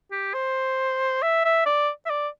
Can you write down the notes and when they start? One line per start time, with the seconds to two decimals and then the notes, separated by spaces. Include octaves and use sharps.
0.11 G4
0.34 C5
1.22 E5
1.45 E5
1.66 D5
2.06 E5
2.10 D5